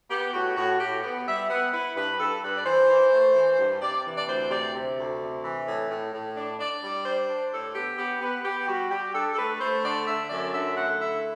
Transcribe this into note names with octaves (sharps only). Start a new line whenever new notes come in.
B3 G4
A2 F#4
A2 F#4
A2 G4
B3
G3 E5
B3 F#5
E4 B4
G2 B4
G2 A4
G2 B4
D5
E3 C5
E3
A3
E3
G2
C3 D5
E3
D5
D2 C5
C3 D5
C3
D2
C3
E3
A2
A2
A2
D4
D4 D5
G3
D4 C5
D4
A2 A4
B3 G4
B3 G4
B3 B4
B3 G4
G3 F#4
G3 G4
D4 A4
A4
A3 B4
A3 C5
D3 D5
D3 E5
F#2 D5
D3 E5
A3 F#5
E4 E5